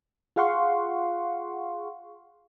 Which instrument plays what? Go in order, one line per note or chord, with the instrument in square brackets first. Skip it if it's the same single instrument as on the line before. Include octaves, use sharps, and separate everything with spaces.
[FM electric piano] F4 G#4 F5 F#5 C6 C#6